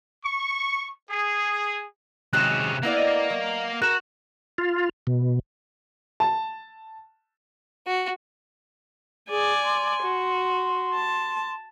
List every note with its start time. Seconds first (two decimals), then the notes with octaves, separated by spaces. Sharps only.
0.24 C#6
1.10 G#4
2.33 C3 D#3 F#3 G#3 C#4 F#6 E7
2.83 A#3 B3 E4 A#4 D5
2.97 D#5 D#7
3.30 F#3
3.82 F#4 A#4 F#6 E7
4.58 F4
5.07 B2
6.20 A5
7.87 F#4
9.30 G#4 D5 G#5
9.64 C6
10.03 F#4
10.95 A5